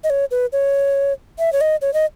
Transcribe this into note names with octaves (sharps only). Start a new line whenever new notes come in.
D#5
C#5
B4
C#5
E5
C#5
D#5
C#5
D#5